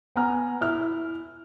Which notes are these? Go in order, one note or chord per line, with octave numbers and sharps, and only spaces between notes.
B3 F#5 G#5 A#5 F6
E4 F6